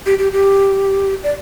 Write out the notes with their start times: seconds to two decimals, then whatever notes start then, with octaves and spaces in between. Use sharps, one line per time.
0.06 G4
0.19 G4
0.32 G4
1.24 D5